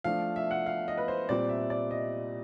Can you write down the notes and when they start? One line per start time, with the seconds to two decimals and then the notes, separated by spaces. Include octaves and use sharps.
0.04 F3 A3 D4 F5
0.36 E5
0.51 F#5
0.66 F5
0.88 D#5
0.98 B4
1.08 C5
1.29 A#2 G3 C4 D5
1.49 E5
1.70 D5
1.91 D#5